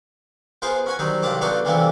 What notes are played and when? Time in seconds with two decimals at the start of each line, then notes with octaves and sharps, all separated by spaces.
0.62 B3 F4 G#4 A#4 C5
0.86 C#4 F#4 G#5
0.99 D#3 F#3 G3 C4 D#4
1.22 C2 F#3 F4 G4 A5 D6
1.41 B3 D4 D#4 F4 F#4 A4
1.65 D2 C3 E3 G3 A#3 B3